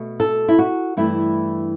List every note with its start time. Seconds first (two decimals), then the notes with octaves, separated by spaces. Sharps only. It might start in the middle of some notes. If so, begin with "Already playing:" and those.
Already playing: B2 A3
0.20 A4
0.48 E4
0.59 F#4
0.97 G2 E3 A3 E4